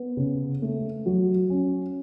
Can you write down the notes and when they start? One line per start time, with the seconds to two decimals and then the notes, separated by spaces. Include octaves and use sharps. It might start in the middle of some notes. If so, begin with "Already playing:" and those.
Already playing: B3
0.17 C#3
0.62 A3
1.06 F#3
1.50 C#4